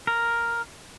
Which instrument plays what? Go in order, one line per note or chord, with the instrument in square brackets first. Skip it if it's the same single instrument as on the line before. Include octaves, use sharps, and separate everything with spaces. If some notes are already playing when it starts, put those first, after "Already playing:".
[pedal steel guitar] A#4